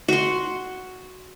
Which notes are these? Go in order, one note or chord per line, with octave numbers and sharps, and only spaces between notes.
F#4 C6